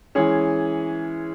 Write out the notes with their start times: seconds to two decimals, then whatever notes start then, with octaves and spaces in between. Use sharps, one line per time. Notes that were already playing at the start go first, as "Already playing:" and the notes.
0.15 E3 G#3 C#4 G#4